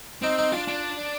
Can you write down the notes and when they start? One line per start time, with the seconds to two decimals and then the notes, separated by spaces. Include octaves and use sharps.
0.22 C4 D#4
0.38 D#4
0.52 D4 F4
0.68 D4